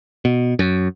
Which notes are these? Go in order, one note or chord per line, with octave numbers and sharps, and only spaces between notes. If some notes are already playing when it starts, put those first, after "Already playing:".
B2
F#2